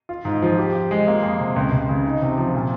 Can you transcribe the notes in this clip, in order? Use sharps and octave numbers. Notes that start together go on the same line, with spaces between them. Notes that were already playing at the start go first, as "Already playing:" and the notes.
F4
G#2
F3
G4
F3
G#3
A#3
F2
C3
C#2
C#2
C#3
D#4
C3
F3
A#2